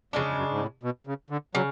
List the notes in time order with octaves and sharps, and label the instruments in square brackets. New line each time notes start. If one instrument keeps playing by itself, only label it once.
[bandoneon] F2 [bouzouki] C#3 G#3 D4
[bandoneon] F2
F#2
G#2
A2
B2
C#3
D3
[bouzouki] C#3 [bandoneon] F#3